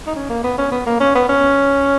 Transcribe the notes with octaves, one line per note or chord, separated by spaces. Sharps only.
D#4
C#4
A#3
B3
C#4
B3
A#3
C#4
B3
C#4